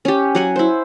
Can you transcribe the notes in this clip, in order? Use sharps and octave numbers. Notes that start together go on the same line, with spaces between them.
C#4 G4
F#3 F#5 G#5
E4 C5